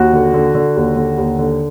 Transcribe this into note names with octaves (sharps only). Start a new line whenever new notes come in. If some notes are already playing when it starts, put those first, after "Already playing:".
Already playing: D#2 F#4
D3
D3
D3
D#2
D3
D#2
D3